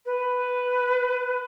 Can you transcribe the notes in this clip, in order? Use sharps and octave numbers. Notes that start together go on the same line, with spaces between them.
B4